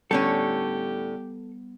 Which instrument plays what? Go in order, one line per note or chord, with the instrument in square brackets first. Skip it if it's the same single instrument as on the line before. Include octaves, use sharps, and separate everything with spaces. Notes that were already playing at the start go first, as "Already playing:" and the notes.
[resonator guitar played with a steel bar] A2 D3 C#4 [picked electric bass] G3 B3 [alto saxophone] G4 [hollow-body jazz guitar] A4